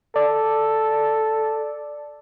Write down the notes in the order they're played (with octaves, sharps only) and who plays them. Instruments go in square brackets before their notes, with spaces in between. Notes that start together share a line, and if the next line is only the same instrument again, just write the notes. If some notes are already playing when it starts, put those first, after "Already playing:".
[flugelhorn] A4 [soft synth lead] D5